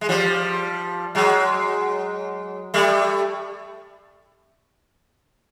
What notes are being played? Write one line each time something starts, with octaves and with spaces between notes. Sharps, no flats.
G#3
F3 G3
F#3 G#3
G3 A3